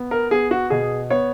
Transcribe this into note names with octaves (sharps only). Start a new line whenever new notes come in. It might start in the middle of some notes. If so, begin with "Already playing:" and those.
Already playing: B3
A#4
B3 G#4
F#4
B2 G#4
B3 C#5